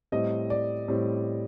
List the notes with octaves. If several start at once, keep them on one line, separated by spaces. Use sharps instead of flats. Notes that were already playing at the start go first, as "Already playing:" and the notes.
A2 G3 C4 D#5
D5
A2 G3 C4